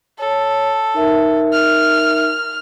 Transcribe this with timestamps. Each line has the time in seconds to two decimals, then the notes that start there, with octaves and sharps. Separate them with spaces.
0.19 A4 C#5
0.94 D#4 A#4 E5
1.53 F6